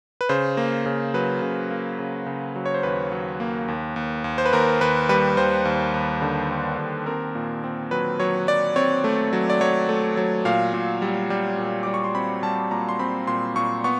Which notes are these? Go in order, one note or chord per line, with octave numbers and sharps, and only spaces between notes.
B4
C#3 C5
A#3
C#3
F#3 B4
C#3
A#3
C#3
C#3
F#3
C#5
C5
D#2 B4
F#3
A#3
D#2
D#2
D#2
C5
B4
D#2 A#4
D#2 B4
G3 B4
D#2 C5
D#2
D#2
D3
D#2
D#2
C4 A#4
A#2
C4
F#3 B4
F#3 C#5
F#3 D5
C4 C#5
A3
F#3
D5
F#3 C#5
A3
F#3
A#2 F5
A#2
G3
G3
A#2
G3 D6
C#6
C6
C4 B5
G3 A5
A#2 A#5
C6
C4 B5
A#2 C6
A#2 C#6
B3 C#6